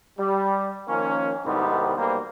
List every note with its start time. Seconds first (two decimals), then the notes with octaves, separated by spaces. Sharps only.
0.19 G3
0.88 D#3 F3 A#3 C#4
1.45 C2 G#2 D#3 G3 B3 C4
1.97 B1 G3 A#3 C5